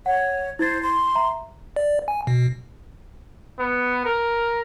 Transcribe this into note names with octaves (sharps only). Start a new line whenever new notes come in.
C#5 F#5
E4 C5 G#6 A6
C6
E5 A#5
D5
G#5
B2
B3
A#4